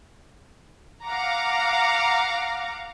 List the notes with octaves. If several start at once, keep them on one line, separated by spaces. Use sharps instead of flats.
F5 F#5 A#5 D6